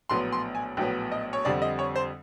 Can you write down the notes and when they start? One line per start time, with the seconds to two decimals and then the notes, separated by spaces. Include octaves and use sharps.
0.09 A#1 A2 F#3 B3 C6
0.32 C6
0.55 G#5
0.77 A#1 A2 F#3 B3 G5
1.11 D#5
1.33 C#5
1.45 F2 D3 G3 C4 D5
1.62 D#5
1.79 C#5
1.95 C5